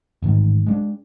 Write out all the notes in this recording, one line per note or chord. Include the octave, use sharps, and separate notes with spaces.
A1 G#2 D#3
G#3 A#3 D4